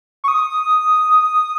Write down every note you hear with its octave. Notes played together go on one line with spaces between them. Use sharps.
C#6
D#6